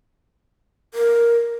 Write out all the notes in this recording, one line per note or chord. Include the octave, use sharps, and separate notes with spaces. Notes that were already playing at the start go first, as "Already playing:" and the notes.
A#4